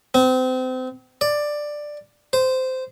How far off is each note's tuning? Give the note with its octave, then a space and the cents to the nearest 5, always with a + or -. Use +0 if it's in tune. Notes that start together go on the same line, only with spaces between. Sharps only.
C4 -30
D5 +10
C5 -15